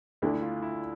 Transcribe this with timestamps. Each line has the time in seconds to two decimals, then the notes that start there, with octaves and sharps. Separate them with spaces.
0.22 D2 D3 A3 D4 E4
0.33 E4
0.42 F4
0.62 E4